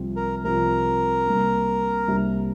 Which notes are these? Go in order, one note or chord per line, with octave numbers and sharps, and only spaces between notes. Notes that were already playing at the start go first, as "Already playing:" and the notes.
Already playing: C2 C3 F3 C4 F4
A#4
C2 C3 F3 C4 F4 A#4
C2 C3 G3 A#3 D4
C2 C3 G3 A#3 D4